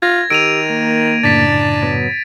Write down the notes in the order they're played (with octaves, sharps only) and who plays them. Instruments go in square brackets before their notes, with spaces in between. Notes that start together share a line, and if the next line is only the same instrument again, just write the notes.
[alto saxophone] F4 [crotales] G#6 A#6
[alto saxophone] D#3 [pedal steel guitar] G4 E6 [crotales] D7 D#7 F7
[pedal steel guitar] A#3
[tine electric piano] F#2 A2 C#3 [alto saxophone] D4 [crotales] A6 B6 D7
[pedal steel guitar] F#3 B3